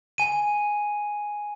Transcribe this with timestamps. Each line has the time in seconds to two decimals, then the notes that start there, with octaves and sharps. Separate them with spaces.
0.18 G#5 D#7